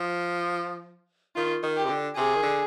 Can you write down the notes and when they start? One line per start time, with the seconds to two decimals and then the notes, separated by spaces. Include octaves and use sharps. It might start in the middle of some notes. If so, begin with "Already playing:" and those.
Already playing: F3
1.36 D#3 F4
1.63 D#3
1.76 G4
1.85 C3
1.90 D3
2.17 C3 G#4
2.35 D#3
2.43 D3